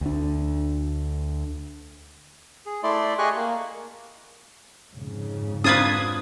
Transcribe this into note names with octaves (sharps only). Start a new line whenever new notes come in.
D2 D4
G#4
A3 E4 D5 C6
G4 G#4 D#5 G#5 C#6 F#6
A#3
F2 G#2 C#3
C4 D4 F4 B4 D#6 G#6